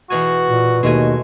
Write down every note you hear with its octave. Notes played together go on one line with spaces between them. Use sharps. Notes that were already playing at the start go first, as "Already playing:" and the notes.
E2 B2 F#4 G#5
A#2
D#2 B2 G#3 A3 G#5